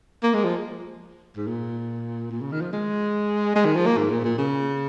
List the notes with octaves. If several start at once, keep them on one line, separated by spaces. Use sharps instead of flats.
A#3
G#3
F3
G#2
A#2
A#2
C#3
D#3
F3
G#3
G#3
D#3
F3
A#3
G#2
A#2
A#2
C#3